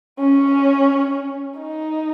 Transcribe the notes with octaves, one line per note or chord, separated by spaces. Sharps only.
C#4
D#4